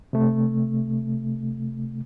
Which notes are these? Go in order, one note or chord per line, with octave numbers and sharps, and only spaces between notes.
C3 A3